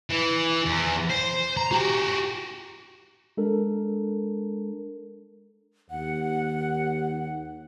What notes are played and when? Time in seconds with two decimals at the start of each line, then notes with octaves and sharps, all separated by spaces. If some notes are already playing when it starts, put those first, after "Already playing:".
0.10 E3
0.65 E2
1.10 C5
1.57 A#5
1.71 F#4 G4
3.37 G#3 D4 A4 A#4
5.91 D#2 F#5